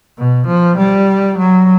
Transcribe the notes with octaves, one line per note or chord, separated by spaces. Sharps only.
B2
F3
G3
F#3